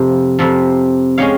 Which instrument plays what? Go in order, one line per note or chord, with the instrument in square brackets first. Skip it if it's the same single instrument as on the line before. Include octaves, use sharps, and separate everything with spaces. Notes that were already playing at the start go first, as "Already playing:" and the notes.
Already playing: [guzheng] F2 C3 F3
F2 C3 F3
G#3 C#4 G4 C#5 F5